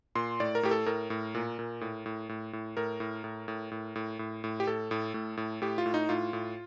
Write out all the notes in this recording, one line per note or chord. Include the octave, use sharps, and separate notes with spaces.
A#2 C6
A2 D5
A#4
A2 G4
A4
A2 A#4
A2
A#2
A#2
A2
A2
A2
A2
A2 A#4
A2
A2
A2
A2
A2
A2
A2
G4
A2 A4
A2
A2
A2
A2 G4
F4
A2
D#4
A2 F4
A2